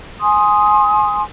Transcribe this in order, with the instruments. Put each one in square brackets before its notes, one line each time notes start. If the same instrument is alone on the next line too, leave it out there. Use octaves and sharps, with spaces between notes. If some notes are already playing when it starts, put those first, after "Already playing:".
[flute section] G#5 C6 D#6